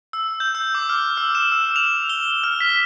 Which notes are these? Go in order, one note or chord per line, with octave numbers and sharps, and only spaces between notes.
E6
G6
E6
D6
F6
E6
E7
E6
F7
G7
F6
B6